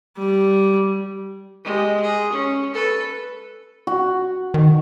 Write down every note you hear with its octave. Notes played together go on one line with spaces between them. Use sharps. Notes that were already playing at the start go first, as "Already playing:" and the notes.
G3
G#3 G4
G#4
C#4
A4 B4
F#4
D#3